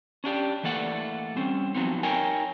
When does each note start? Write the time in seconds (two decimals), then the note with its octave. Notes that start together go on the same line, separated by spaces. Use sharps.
0.24 C#4 D4 G4 D5
0.63 E3 A3 A#3 D5 F#5
1.36 G3 C4 C#4
1.75 F3 F#3 B3 C4 D#4
2.03 D#4 A#4 C#5 G5 G#5